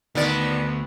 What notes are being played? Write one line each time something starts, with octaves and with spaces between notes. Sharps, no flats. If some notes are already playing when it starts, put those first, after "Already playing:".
D2 D#3 B3 D5